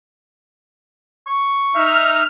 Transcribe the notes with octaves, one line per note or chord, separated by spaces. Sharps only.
C#6
D#4 E5 F6